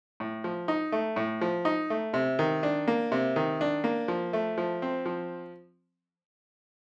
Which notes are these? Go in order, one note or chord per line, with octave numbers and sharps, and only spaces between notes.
A2
F3
D#4
A3
A2
F3
D#4
A3
C3
D#3
D4
A#3
C3
D#3
D4
A#3
F3
A3
F3
C4
F3